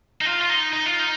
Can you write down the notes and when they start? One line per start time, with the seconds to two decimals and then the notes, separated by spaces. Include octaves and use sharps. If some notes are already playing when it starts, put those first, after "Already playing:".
0.21 D#4
0.25 F4
0.41 F4
0.49 D#4
0.72 D#4
0.86 F4
0.99 D#4